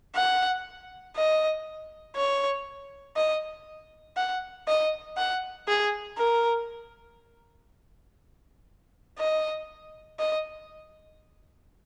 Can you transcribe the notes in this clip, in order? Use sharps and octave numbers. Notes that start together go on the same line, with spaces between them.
F#5
D#5
C#5
D#5
F#5
D#5
F#5
G#4
A#4
D#5
D#5